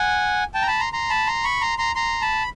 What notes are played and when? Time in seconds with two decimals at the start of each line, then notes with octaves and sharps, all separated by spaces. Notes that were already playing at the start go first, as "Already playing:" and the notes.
Already playing: F#5 G#5
0.54 G5 A5
0.62 A#5
0.67 A5 B5
0.79 A#5 C6
0.93 A#5 C6
1.10 A5 B5
1.27 A#5 C6
1.44 B5 C#6
1.61 A#5 C6
1.78 A#5 C6
1.95 A#5 C6
2.21 A5 B5